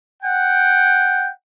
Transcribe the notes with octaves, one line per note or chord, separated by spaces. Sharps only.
F#5 G5